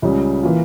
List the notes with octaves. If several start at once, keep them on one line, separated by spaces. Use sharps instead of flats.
C#2 C#3 G3
E3 A#3 F4